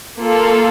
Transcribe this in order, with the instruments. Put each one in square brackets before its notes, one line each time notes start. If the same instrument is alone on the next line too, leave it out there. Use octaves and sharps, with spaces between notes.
[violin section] A#3 F4 A4